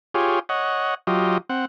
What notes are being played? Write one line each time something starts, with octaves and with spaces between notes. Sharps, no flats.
F4 G4 G#4 C#5
C#5 D#5 F#5
F#3 F4 G4 D#5
C4 F#5